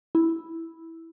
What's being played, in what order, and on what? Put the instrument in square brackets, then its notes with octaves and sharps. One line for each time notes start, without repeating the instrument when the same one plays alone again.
[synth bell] E4